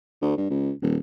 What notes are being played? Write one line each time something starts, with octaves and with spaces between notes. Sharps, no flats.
D2
G2
C#2
D#1